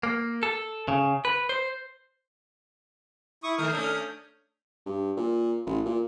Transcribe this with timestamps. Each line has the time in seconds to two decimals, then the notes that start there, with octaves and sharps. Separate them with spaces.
0.03 A#3
0.43 A4
0.88 C#3
1.25 B4
1.49 C5
3.43 E4 C#6 D#6
3.58 D#3 A3 A#4 D#6 F6
3.73 A3 C#4 D4
4.86 G2
5.17 A#2
5.67 A1
5.86 A#2